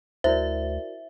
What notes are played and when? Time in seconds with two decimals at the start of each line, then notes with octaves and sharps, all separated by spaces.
0.24 D2 E4 F#4 A#4 C5 D5 E5